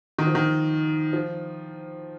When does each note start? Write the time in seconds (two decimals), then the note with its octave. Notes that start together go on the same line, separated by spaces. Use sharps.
0.19 D#3
0.27 F3
0.35 D#3
1.13 F3